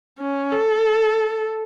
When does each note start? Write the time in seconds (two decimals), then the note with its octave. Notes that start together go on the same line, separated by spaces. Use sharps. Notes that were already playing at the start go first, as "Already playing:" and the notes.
0.19 C#4
0.52 A4